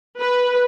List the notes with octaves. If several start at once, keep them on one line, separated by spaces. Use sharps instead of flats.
B4